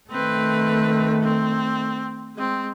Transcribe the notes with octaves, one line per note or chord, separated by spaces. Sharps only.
D#3 A3 C4 B4
C4
G#3 C4